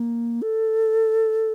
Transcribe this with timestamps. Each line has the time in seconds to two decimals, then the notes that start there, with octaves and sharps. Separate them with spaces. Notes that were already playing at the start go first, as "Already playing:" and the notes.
Already playing: A#3
0.42 A4